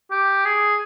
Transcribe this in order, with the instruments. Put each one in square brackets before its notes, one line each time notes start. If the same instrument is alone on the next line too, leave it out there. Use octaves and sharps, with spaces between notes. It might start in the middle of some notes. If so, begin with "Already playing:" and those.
[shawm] G4
G#4